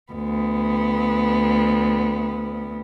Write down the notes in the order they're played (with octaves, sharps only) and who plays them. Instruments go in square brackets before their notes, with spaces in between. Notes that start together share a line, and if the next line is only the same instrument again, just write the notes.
[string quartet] D2 B3